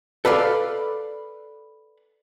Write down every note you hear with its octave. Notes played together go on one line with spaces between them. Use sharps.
A4 B4 D5 F5